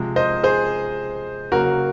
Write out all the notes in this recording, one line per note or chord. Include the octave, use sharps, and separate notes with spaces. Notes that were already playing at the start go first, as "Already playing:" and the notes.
Already playing: C3 F3 G#3
C5 D#5
G#4 C5
C#3 F#3 A#3 F#4 A#4